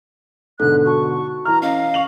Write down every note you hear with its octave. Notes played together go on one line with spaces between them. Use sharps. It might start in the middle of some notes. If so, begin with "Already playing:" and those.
G#2 B2 D3 A4 F#6
F#4 A5 C#6
E3 A#5 F6
C#4 D#5 F5
C#6 F7 F#7